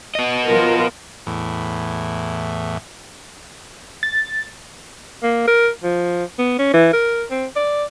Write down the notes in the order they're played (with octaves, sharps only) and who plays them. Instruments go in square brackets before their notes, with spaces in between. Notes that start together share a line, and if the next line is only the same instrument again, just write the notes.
[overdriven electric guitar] B3 D#5
[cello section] F3 F4 A#4
[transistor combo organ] E2 A2
[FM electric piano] A6
[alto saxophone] A#3
A#4
F3
B3
C#4
E3
A#4
C4
D5